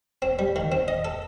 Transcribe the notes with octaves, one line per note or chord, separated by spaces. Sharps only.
C4
G3
D#3
C4
D#5
A4